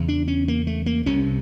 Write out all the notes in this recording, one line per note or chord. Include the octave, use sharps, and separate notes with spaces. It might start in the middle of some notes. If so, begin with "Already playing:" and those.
Already playing: E2 C#3
D4
C#4
A#3
A3
A#3
C2 C3 C#4